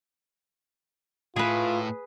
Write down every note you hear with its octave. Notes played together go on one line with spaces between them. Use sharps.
A2 F4 G#4 B4